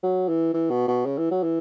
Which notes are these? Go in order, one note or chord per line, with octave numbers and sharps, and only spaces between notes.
F#3
E3
E3
B2
B2
C#3
E3
F#3
E3